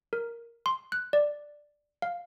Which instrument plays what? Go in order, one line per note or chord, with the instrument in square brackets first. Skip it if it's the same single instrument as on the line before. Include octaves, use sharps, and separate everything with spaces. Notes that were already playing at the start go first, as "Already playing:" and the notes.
[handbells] A#4
C6
F#6
D5
F5